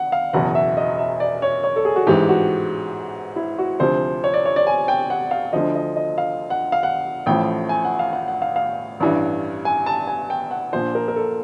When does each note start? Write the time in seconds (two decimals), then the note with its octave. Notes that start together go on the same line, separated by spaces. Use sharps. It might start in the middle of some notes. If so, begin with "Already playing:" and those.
Already playing: F#5
0.12 F5
0.33 F#1 E2 B2 F#5
0.55 E5
0.77 D#5
0.98 E5
1.20 D5
1.42 C#5
1.63 C#5
1.76 A4
1.85 G#4
1.96 F#4
2.07 A1 G#2 E3 G4
2.29 F#4
3.36 E4
3.58 F#4
3.80 D2 C3 F3 C5
4.24 C#5
4.34 D5
4.45 C#5
4.56 D5
4.67 G#5
4.88 G5
5.10 F#5
5.31 F5
5.53 D2 D3 F3 D#5
5.75 D#5
5.96 D#5
6.18 F5
6.50 F#5
6.72 F5
6.83 F#5
7.26 A1 A2 F3 G5
7.69 G#5
7.84 F#5
7.99 F5
8.13 F#5
8.28 F#5
8.42 F5
8.56 F5
9.00 A1 G2 E3
9.65 G#5
9.86 A5
10.07 G#5
10.30 G5
10.51 F#5
10.73 A#1 A#2 F3 C5
10.95 A#4
11.08 A#4
11.16 A4